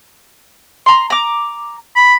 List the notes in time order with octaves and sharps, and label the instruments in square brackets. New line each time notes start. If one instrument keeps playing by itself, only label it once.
[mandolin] A#5 C6
A#5 D6
[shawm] B5